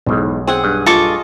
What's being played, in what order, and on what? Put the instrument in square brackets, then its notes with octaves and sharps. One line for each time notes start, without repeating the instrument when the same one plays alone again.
[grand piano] B1 [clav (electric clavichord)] E2 G#2
[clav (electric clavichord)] C4 [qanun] G#4 F#5 G#5
[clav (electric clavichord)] G2
[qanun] F4 D#5 [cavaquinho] A4 C#6 D6